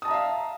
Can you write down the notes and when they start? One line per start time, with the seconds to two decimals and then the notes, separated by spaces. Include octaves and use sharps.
0.02 D#6
0.05 A5
0.08 A#5
0.11 E5
0.13 F5